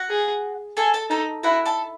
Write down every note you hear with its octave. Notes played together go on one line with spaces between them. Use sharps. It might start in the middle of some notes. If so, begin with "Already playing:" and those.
Already playing: F#4 F#5
G#4
G#4 A4 G#5
A4 A5
D#4 A4 A5
E4 F#4 F#5
A4 A5